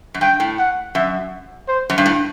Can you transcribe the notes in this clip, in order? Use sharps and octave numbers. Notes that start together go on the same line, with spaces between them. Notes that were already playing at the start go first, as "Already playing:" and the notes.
F#2
G2 G5
A2
F#5
F#2 E5
C5
F#2
G2
A2